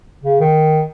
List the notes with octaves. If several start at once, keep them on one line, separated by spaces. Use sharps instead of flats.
C#3
D#3